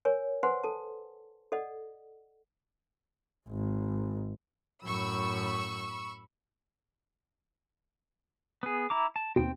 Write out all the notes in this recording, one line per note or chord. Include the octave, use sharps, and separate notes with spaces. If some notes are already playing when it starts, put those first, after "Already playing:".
A#4 C#5 G#5
B4 C5 F#5 G#5 C6
A4 A5
A4 D5 D#5 F#5
G#1
F#2 A2 B5 C#6 E6
B3 G#4
E4 A#5 D6
A5
D#2 B2 C4 G5